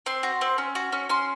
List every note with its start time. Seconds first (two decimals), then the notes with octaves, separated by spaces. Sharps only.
0.06 C4 C6
0.23 F#4
0.41 C4
0.58 C#4
0.75 F#4
0.92 C#4
1.09 C#4 C6